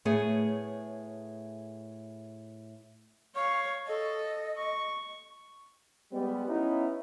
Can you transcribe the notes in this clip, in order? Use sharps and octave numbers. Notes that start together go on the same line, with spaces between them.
A2 A3 B3 G#4 C#5 G#5
C#5 F5 C#6
A4 D#5
C#6
G3 G#3 B3
B3 C#4 D#4 E4